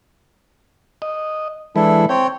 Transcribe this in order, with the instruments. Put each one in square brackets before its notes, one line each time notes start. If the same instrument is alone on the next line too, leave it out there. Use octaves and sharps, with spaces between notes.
[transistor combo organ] D#5
[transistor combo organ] E3 G#3 B4 [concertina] D4 E4 A4
[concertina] C4 C#5 [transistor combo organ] G5